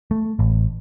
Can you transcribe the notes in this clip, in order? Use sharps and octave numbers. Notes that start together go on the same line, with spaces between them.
A3
A1